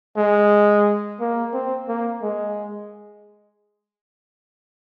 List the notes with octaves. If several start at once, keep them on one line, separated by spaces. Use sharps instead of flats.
G#3
A#3
C4
A#3
G#3